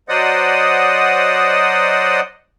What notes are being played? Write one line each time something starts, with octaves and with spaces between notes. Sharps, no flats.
F#3 C5 D5 D#5 F#5 D#6